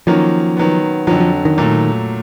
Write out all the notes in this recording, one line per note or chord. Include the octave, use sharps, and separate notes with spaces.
D#3 F3 F#3 A#3 C#4
D#3 F#3 B3
F2 D3 F3 F#3
F3
D#3
A#2 F#3 A3